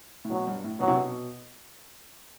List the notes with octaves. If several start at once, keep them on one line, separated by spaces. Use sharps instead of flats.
A2
B2 F#3
G2
A2
B2 F#3
C3
B2